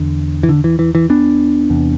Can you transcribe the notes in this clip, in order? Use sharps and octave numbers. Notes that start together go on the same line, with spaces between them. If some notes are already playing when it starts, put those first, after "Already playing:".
Already playing: E2 D3
E3
D3
E3
E3
E3
B3 D4
E2 C3